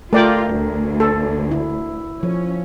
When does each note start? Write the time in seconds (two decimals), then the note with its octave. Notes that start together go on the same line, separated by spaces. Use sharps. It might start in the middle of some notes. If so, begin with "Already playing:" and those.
0.13 A3 F4 A#4 D5 G5
0.51 D2
1.00 A4
1.51 E4
2.23 F3 C#4